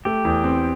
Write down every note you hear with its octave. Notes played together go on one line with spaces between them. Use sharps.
A3 G4
E2
C4